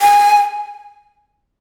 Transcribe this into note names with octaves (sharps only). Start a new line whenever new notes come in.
G#5